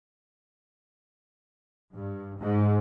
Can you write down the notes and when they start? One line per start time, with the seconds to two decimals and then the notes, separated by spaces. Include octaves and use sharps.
1.95 G2
2.40 G#2